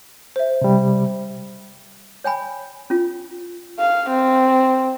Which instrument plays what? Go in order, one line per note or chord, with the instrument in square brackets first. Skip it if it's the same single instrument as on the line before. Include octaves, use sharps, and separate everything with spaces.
[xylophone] C5 E5
[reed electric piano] C3 G3
[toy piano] C#5 G5 G#5 B5
C#4 F4
[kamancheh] F5
C4